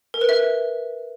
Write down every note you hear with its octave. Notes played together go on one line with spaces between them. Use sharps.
A#4
B4
E5